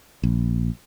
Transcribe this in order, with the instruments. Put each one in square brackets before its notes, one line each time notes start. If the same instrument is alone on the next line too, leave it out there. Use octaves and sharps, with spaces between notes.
[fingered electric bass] A#1